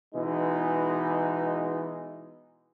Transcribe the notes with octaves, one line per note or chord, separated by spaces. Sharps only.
B2 E3 G#3 D#4